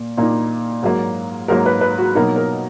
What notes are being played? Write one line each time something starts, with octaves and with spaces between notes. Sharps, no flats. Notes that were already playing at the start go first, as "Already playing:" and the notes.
Already playing: A#2 A#3
A#2 A#3 D#4
G#2 F#3 A#3
G#2 F#3 A#3 A#4
B4
B4
F#4
B2 F#3 A#3 D#4 A#4
A#4